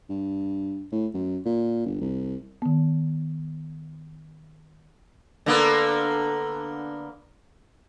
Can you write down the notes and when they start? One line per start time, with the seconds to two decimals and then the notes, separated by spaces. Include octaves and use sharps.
0.09 G2
0.92 A2
1.14 F#2
1.45 A#2
1.86 G1
2.01 C2
2.62 D#3 B3
5.46 D3 A#3 B3